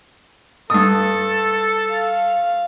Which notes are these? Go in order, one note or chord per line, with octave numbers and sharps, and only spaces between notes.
G2 A4 D#6
F5